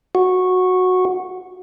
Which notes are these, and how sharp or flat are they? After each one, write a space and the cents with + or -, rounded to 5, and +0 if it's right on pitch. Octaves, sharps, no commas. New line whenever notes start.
F#4 -10